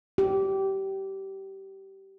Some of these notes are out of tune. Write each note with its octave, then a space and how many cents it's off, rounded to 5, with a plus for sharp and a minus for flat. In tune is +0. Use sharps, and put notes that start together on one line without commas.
G4 -20